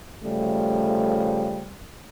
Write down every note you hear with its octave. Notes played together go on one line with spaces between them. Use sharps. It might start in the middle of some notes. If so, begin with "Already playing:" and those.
C#3 F3 G3 A3